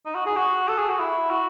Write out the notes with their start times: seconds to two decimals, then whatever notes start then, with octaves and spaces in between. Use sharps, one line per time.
0.06 D#4
0.15 F#4
0.26 G#4
0.36 F#4
0.68 A4
0.78 G#4
0.89 F#4
1.00 E4
1.30 F#4